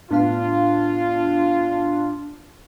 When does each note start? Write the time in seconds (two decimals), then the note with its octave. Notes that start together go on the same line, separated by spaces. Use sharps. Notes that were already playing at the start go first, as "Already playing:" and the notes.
0.11 A2 B3 D4 F4 F5